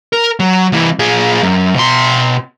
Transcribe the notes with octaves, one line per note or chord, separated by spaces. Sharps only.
A#4
F#3
C2 E3
A#2 G#4
F#2
B2 C6